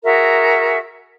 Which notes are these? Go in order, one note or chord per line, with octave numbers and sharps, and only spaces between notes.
F#4 G#4 A#4 E5